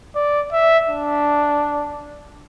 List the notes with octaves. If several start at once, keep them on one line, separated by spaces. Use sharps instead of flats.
D5
E5
D4